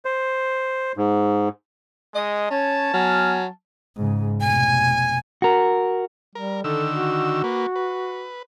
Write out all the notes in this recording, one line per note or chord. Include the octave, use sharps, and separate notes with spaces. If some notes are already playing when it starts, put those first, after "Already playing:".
C5
G#2
G#3 D#5
C#4 C#5 A5
F#3 B3 G#5 F6
G#2 C#3
F1 B2 G#5
F#4 A#4
G3 A#4
D3 D#3 A4 E6
F#4
A#3 B4
B4